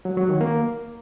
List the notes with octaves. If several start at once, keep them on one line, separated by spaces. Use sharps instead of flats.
F#3
F#3
D#3
A#3